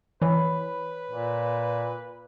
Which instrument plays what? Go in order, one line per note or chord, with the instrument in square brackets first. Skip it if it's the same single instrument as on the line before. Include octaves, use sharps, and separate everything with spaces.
[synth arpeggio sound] E3 [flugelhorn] B4 [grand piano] C#5 B5
[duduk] A#2